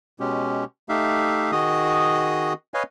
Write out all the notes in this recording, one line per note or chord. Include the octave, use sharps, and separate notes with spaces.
B2 G#3 C#4 G4
A3 D#4 G4 E5 F5
D#3 F#4 G#4 D#5 D#6
B4 C#5 D#5 F5 G#5